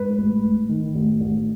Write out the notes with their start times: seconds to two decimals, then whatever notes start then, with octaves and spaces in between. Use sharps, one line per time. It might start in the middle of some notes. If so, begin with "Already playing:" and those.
Already playing: G#2 B4
0.18 A1
0.44 A1
0.69 D#3
0.95 A1
1.20 A1